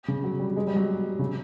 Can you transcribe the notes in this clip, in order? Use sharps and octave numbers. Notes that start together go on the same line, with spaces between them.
C#3
F#3
G3
G#3
G3
F#3
C#3